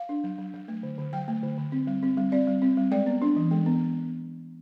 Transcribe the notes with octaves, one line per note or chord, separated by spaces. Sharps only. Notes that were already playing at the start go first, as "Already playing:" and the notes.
Already playing: F5
D4
F#3
F#3
F#3
A3
D3
D3
F#3 G5
A3
D3
D3
C4
G3
C4
G3
C4 D5
G3
C4
G3
G#3 D5
B3
D4
E3
G#3
B3